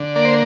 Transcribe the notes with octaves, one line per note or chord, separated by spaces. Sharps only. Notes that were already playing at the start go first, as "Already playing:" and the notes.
Already playing: D3
A#3 D5
C5